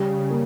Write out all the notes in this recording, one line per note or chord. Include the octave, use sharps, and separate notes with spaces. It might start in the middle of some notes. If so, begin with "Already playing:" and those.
Already playing: C#3 G3
A#3